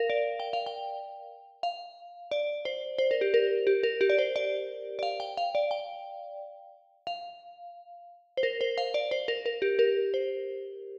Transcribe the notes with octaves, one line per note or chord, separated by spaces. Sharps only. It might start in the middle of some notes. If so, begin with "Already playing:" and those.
Already playing: A#4 F5
D5
G5
F5
G5
F5
D5
C5
C5
A#4
G4
A#4
G4
A#4
G4
D5
C5
D5
D5
F5
G5
F5
D5
G5
F5
C5
A#4
C5
F5
D5
C5
A#4
A#4
G4
A#4
C5